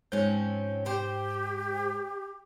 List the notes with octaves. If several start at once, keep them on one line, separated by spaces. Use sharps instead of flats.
G#2 F3 C4 C#4 G6
G4 C5 G5